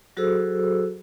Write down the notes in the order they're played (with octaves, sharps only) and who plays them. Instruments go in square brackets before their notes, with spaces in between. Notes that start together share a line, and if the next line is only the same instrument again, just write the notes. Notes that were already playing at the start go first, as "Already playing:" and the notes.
[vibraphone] F#3 F#4 G#4 A4 C5 E6